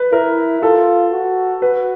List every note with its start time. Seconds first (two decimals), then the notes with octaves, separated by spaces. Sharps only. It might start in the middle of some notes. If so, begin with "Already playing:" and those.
Already playing: B4
0.12 E4 A#4
0.62 F4 A4
1.12 F#4
1.62 F#4 B4